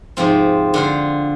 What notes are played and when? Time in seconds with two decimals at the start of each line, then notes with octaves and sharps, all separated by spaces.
0.17 G#2 C3 F3 C4
0.74 D3 F4 C5